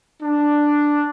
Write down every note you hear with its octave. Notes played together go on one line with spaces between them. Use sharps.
D4